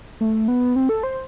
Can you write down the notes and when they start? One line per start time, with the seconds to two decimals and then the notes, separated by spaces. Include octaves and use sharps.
0.21 A3
0.48 B3
0.76 C4
0.89 A4
1.03 C5